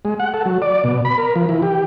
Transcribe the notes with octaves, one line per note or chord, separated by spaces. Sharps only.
G#3
F#5
A4
F#3
D5
B2
B5
A#4
F3
E3
G4